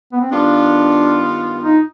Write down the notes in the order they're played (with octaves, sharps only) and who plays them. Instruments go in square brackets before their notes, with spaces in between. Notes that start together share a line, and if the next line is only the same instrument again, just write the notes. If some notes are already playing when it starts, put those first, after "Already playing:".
[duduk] B3
C4
[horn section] G2 D#3 B3 F4 [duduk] D4
[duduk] D#4